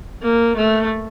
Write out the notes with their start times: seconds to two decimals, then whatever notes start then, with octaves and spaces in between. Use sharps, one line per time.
0.22 A#3
0.57 A3